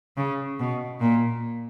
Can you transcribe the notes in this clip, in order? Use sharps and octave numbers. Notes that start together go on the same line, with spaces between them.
C#3
B2
A#2